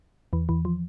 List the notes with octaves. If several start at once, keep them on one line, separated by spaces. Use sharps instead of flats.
E2 E3
E2 E3
F3